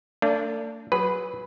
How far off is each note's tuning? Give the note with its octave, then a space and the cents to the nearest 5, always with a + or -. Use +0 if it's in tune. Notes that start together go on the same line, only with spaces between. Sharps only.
A3 +45 D4 -20
F#3 +0 G#4 -15 B4 +0